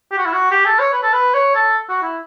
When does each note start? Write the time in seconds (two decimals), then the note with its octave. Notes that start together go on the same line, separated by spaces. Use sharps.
0.11 G4
0.18 F#4
0.26 E4
0.33 F#4
0.51 G4
0.66 A4
0.79 C#5
0.93 B4
1.03 A4
1.13 B4
1.34 C#5
1.55 A4
1.89 F#4
2.02 E4